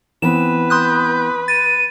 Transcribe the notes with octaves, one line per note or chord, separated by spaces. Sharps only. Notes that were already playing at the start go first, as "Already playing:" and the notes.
E3 B3 C4 B4 E7
C6 D#6 F#6 G6
A6 D#7